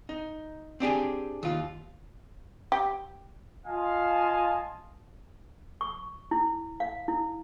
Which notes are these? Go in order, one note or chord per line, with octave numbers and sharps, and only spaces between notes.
D#4
C4 D4 G4 G#4
D#2 F4
G4
F4 D#5 F5 G#5 A5
C#6
E4
F5
E4